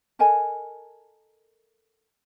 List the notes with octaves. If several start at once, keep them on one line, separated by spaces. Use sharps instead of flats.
A4 A#4 D#5 G#5